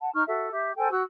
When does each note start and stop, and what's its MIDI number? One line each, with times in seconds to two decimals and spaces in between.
0.01 0.10 78
0.01 0.10 81
0.14 0.23 63
0.14 0.23 85
0.14 0.23 89
0.28 0.50 66
0.28 0.50 69
0.28 0.50 76
0.51 0.72 67
0.51 0.72 76
0.77 0.89 69
0.77 0.89 72
0.77 0.89 79
0.77 0.89 80
0.91 1.03 66
0.91 1.03 88
0.91 1.03 90